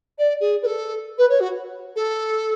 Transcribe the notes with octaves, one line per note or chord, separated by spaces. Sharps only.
D5
G#4
B4
A4
B4
C#5
F#4
A4